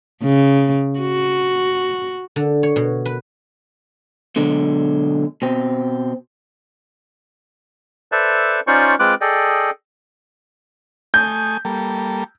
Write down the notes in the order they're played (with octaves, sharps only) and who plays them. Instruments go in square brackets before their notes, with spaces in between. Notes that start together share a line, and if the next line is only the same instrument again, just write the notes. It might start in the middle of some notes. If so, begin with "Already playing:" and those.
[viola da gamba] C#3
F#4
[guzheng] D3
C#5
B2
B4
[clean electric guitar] B2 D3 F#3 G#3
B2 C4
[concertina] A4 B4 C5 D5 E5 A5
C#4 D#4 F4 C5 D5 C#6
G#3 C4 F4 B4 D6 F#6
G#4 A4 D5 D#5 G5
[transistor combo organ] A3 G#5 D#6 [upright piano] G6
[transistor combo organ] G3 A#3 A4